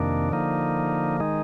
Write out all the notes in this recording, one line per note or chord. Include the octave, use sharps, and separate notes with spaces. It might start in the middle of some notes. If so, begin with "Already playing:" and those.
Already playing: F2 C3 D#3 A#3 D4
D3 F3 A#3 D#4
D#3 G#3 D#4